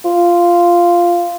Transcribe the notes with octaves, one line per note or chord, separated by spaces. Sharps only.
F4